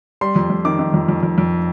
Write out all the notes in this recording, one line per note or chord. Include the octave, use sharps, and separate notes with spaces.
G3 C6
F2
F2
D#3 D6
D#3
F2
F2
F2
F2